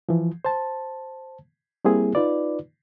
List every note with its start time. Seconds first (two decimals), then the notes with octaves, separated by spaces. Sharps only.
0.09 E3 F3
0.45 C5 A5
1.85 G3 A#3 C4 E4 G#4
2.15 D#4 F4 B4 D5